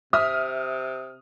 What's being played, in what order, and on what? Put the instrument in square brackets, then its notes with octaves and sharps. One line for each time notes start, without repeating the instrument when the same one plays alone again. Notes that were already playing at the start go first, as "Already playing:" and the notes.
[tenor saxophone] C3 [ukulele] E5 [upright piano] D#6 F6